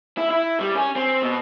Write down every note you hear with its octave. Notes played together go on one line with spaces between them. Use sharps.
E4
E4
G3
C#4
C4
B2